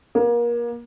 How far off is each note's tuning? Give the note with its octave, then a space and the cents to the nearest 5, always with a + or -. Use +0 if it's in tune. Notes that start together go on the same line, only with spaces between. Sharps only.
A#3 +30